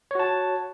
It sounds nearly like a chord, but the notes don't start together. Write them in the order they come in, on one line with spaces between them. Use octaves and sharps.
C#5 F#4 A5